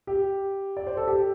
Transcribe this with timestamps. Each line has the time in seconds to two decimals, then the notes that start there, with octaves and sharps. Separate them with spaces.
0.07 G4
0.77 D5
0.87 C5
0.97 A4
1.08 G4